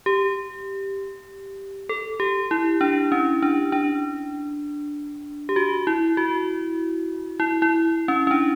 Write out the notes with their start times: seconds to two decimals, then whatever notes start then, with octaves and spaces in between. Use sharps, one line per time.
0.06 G4
1.89 A4
2.20 G4
2.51 E4
2.81 D4
3.12 C#4
3.42 D4
3.72 D4
5.49 G4
5.56 F#4
5.87 E4
6.17 F#4
7.40 E4
7.62 E4
8.08 C#4
8.27 C#4
8.31 D4